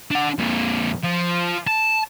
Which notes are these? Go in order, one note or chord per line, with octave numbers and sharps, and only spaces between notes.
D4 F#5
F2 A#2
F3
A5